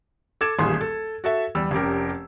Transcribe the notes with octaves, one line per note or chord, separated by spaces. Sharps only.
A4 D6 G#6 E7
D#1 A1 D#2 G#4 C6
A4
F#4 A4 E5
E2 G3 E6
F1 C#4 G4 A#4